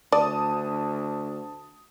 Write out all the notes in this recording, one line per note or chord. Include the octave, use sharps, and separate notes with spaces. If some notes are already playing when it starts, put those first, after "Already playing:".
D2 D5 A5 D#6